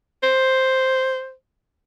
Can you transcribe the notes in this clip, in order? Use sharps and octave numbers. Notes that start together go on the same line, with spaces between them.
C5